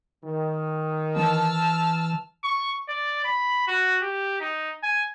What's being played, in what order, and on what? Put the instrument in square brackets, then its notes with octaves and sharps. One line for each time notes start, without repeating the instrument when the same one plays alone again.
[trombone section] D#3
[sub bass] E3 [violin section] A5 E6 F6
[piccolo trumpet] C#6
D5
B5
F#4
G4
D#4
G#5